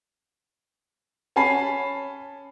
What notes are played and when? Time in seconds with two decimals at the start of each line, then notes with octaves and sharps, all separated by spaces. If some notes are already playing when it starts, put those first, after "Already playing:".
1.36 C#4 G#5 A5 B5 C7